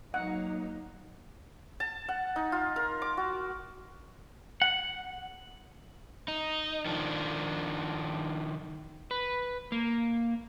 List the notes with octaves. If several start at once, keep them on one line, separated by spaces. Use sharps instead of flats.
F#3 A#3 D#4 F#5
A5
F#5
D#4
F4
A#4
D6
F#4
F#5
D#4
D#3 F3 D4
B4
A#3